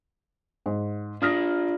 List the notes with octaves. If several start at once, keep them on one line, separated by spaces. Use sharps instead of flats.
G#2
D4 F4 D#6 F6 A#6